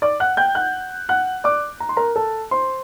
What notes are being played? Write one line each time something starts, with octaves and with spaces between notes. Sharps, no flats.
D5 D6
F#5 F#6
G5 G6
F#5 F#6
F#5 F#6
D5 D6
A#5
C6
A#4 A#5
A4 A5
C5 C6